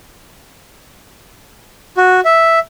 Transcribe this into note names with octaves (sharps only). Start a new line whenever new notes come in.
F#4
E5